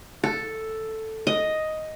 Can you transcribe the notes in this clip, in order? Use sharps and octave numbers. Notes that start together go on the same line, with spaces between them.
A4
D#5